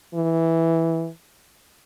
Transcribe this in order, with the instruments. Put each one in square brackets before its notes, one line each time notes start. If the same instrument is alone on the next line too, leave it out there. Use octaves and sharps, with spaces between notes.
[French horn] E3